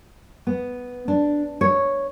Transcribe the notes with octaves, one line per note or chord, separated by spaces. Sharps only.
B3
D4
C#5